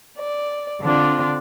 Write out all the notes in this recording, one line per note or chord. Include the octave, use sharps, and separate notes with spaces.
D5
D3 C4 D4 F4 D5